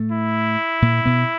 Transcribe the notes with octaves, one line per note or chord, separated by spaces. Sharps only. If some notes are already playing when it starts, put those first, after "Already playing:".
Already playing: A2 A3
E4
A#2 A#3
B2 B3